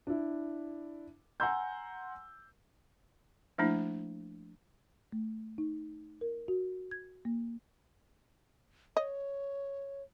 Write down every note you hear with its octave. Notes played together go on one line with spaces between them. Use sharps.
D4 E4
F#5 G#5 A#5 C6 E6 G6
F3 A3 A#3 D4 E4
A3
D#4
A#4
F#4
G#6
A#3
C#5 D#5